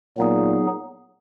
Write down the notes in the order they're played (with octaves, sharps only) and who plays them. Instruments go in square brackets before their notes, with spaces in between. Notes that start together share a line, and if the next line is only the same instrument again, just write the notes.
[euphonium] A#2 [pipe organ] F#3 B3 D#4 G#4